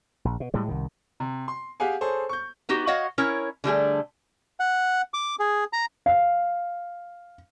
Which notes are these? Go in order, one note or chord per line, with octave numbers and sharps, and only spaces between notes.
A#1
B2
A2 G3 G#3
C2 D#3
C3
C6
G4 G#4 F5 F#5 G#5
G#4 A4 C5 C#5
C#6 G6
B3 D#4 F#4 G4
F#4 C#5 D#5 F5 F#5
C#4 E4 A#4 C#5
D3 G3 A3 G#4
F#5
D6
G#4
A#5
F5